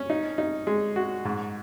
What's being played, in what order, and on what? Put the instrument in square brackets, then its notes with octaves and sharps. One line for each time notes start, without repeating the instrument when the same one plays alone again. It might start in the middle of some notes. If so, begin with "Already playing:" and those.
Already playing: [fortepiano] C#4
D#4
D#4
G#3
F#4
G#2